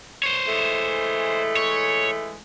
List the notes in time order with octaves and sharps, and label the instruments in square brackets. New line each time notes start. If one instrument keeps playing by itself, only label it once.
[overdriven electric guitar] C5 C#5
[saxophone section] E3 G#3 A3
[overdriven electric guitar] C#5